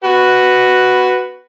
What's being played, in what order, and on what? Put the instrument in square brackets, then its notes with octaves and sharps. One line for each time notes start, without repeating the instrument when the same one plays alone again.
[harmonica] F#4 B4